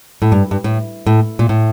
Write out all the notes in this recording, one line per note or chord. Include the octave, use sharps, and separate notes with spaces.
A2
G2
G2
A2
A2
A#2
A2